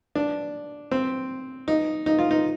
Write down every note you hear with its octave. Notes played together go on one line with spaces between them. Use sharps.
D4
C4
D#4
D#4
F4
D#4